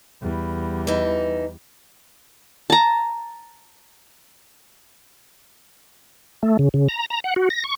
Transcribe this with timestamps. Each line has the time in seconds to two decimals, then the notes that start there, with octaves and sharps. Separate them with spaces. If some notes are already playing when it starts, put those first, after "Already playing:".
0.22 E2 G3
0.87 E3 D#4
2.70 A5 A#5
6.43 A3
6.59 C#3
6.74 C#3
6.89 A#5
7.10 A#5
7.24 F#5
7.36 F#4
7.50 A#6
7.64 C#6